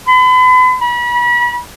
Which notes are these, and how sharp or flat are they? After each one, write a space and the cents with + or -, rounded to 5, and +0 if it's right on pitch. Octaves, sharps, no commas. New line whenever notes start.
B5 +40
B5 -35